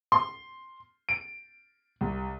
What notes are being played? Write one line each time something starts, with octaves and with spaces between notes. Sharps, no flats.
C6
D7
C2